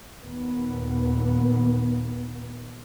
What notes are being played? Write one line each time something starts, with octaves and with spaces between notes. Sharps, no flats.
D#2 A#2 B3